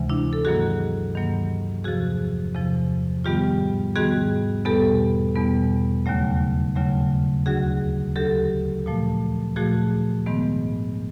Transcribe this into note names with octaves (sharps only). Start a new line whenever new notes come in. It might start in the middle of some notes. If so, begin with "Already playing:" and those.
Already playing: D2 C3 E3 G#3
D4 E4
A4
G2 D#3 F#3 A#3 F#4 G#4
G2 D#3 F#3 A#3
E2 C3 F3 F#4 G#4
E2 C3 F3
G#2 D#3 G3 B3 F4 G4
G#2 D#3 G3 B3 F#4 G#4
E2 B2 G3 B3 G4 A4
E2 B2 G3 B3
D#2 C#3 F#3 A3
D#2 C#3 F#3 A3
D2 D3 F#3 F#4 G#4
D2 D3 F#3 G4 A4
A#2 F3 A3
A#2 F3 A3 F#4 G#4
G#2 D#3 G#3 B3